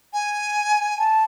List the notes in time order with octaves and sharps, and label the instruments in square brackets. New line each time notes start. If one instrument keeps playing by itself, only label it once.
[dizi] G#5
[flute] A5